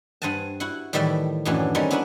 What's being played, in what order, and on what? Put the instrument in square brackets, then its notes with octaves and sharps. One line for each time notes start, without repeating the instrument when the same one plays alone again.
[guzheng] G2 C5 F#5 G#5 A5
E4 F#4 F#5
A2 D#3 E3 G3 E5 G5
F#2 A2 D#3 E3 F#3 D4
G3 C4 C#4 D#4 A#4 C#5
B3 D4 E4 F#4 A#4